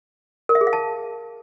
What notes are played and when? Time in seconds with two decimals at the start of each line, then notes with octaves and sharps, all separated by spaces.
0.49 A#4
0.55 E5
0.61 G#4
0.67 F5
0.73 A5